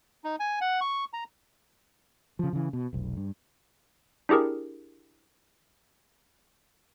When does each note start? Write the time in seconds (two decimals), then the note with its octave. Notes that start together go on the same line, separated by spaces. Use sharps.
0.24 D#4
0.40 G#5
0.61 F#5
0.81 C#6
1.13 A#5
2.39 C#3 F3
2.53 C#3 E3
2.73 B2
2.93 F1 B1
3.17 G2
4.29 D4 E4 G4 G#4 A#4